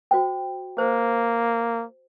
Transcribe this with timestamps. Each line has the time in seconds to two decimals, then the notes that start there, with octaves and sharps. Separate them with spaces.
0.11 F#4 C5 G5
0.78 A#3 C5